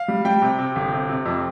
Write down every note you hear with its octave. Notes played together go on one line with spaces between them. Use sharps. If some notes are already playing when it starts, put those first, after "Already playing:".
Already playing: F5
G3
G3 G5
C3
C3
G1
C3
C3
F2